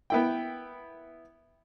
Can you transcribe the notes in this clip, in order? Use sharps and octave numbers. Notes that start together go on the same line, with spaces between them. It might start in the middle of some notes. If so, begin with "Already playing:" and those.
B3 E4 G5